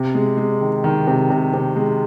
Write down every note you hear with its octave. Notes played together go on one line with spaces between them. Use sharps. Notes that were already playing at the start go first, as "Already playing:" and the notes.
Already playing: C3
G#3
G#3
D#3
D#3
C3
C3
C3
G#3